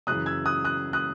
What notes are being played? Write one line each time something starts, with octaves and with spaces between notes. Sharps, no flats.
F#2 C#3 E3 D#6 F#6
E6 G#6
D#6 F#6
D#6 F#6
D#6 F#6